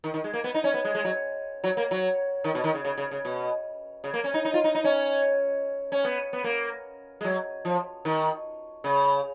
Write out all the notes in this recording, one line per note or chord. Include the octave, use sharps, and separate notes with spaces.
D#3
D#3
G#3
A#3
B3
D#4
C#4
B3
G#3
G#3
F#3
F#3
A#3
F#3
D#3
B2
D#3
C#3
C#3
C#3
C#3
B2
C#3
A#3
C#4
D#4
D#4
F4
D#4
D#4
C#4
C#4
B3
B3
A#3
G#3
F#3
F3
D#3
C#3